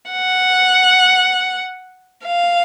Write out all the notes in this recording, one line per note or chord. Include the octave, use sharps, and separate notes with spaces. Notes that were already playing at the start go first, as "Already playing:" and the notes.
F#5
F5